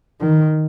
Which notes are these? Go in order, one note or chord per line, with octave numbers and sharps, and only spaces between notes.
D#3